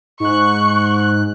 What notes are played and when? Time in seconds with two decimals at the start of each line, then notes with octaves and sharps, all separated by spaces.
0.20 G#2 C#6 F#6